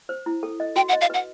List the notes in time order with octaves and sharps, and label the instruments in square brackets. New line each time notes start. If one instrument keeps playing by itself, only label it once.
[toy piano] C5
E4
A4
D#5
[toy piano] F#4 [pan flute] G5
[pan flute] F#5
[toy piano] D#5
[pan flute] F5
[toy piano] B4 [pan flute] F#5